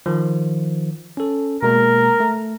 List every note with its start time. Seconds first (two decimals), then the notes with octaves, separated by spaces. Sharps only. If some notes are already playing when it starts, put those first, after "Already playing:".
0.06 D#3 F3
1.17 C#4 A4
1.63 B2 G#3 A#3 A#4
2.20 A3